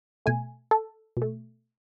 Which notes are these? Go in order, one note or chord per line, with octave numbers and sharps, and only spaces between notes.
B2 A3 G#5
A4
B2 A3